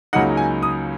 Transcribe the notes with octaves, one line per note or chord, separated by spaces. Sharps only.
C#2 C#3 F#3 A#3 D#4 F#5
G#5
D#6